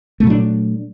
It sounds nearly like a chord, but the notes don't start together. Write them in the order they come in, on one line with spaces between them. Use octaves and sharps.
A3 A#2 F#3 D4